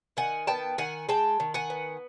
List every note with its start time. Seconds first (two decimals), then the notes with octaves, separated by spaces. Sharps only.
0.17 D#3 F#5 G#5
0.47 B3 G5 A5
0.78 D#3 F#5 G#5
1.09 G#3 G5 A5
1.40 D#3
1.54 F#5 G#5
1.70 B3